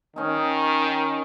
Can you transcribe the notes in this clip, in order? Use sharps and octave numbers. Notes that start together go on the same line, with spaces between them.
D#3 C#4 D#4